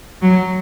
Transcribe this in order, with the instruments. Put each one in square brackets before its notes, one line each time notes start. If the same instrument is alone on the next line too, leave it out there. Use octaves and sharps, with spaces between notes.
[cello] F#3